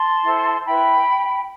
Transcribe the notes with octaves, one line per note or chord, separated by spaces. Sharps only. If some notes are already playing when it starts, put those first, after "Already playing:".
Already playing: A5 C6
E4 A4 C5
E4 B4 G5 B5